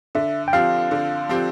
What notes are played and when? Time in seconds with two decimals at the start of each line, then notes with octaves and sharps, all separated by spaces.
0.15 D3 E5
0.48 G5
0.53 F3 C4 G4 F5
0.91 D3
1.29 F3 C4 G4